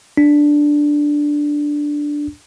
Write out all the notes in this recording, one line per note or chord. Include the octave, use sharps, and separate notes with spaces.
D4